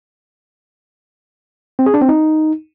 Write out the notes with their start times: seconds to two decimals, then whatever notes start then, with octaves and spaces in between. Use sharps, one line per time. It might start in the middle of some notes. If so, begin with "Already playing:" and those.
1.79 C4
1.86 G#4
1.94 D4
2.01 C4
2.09 D#4